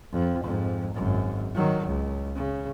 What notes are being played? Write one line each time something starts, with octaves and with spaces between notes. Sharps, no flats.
F2
F2 G#2
G#1 F#2
D#3 F#3
C#2
C#3